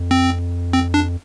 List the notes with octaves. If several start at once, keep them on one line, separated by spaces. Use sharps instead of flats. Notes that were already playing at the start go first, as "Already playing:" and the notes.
Already playing: F2
C4
C4
D4